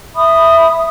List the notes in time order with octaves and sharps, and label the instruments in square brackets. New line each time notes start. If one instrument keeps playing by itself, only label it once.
[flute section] E5 B5 D#6